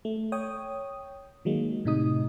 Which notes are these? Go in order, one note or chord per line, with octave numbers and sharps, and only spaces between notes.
A3
C#5 G5 D#6
D#3 F#3 G#3 A#3
A2 C3 D#4 D#6